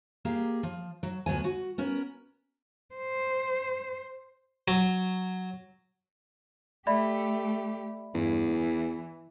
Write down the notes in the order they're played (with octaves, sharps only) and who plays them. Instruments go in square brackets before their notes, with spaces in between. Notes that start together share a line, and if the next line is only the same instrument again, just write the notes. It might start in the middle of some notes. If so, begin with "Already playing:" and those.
[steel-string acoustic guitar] A#3 G4 G#4
F3
F#3
D2 F#3 B3 G#5
F#4
B3 C#4 A#4
[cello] C5
[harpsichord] F#3
[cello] A3 G4 [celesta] D5 E5 B5
[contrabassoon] E2 [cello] G2
[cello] E3